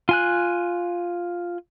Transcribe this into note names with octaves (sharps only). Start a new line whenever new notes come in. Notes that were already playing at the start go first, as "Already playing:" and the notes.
F4 G#5 F#6